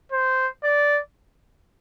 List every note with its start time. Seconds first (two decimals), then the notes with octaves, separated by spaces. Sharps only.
0.12 C5
0.64 D5